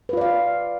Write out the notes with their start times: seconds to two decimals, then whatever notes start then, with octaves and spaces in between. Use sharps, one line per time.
0.09 B4
0.13 F4
0.17 D5
0.21 F5